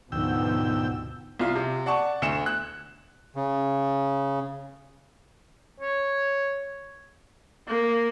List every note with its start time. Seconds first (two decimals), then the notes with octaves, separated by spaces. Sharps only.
0.12 D2 G#2 B2 F3 B3 G5 E6
1.39 C2 F4
1.55 C3
1.86 D5 F#5 A5 C#6
2.22 D2 C#7 E7
2.46 F#6
3.36 C#3
5.80 C#5
7.68 A#3